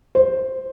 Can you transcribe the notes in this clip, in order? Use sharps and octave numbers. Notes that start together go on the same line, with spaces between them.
C5